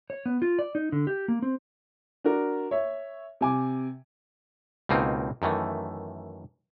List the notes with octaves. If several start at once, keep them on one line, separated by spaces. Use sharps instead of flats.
C#5
B3
F4
D5
D#4
D3
G4
A#3
C4
D4 F#4 A#4
C#5 E5
C3 G#5 D6
C#2 B2 A#3 C4 D#4
F#2 D#3 E3 A3